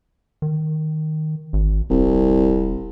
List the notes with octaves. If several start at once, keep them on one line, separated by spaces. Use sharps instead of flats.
D#3
G#1
D#1 C2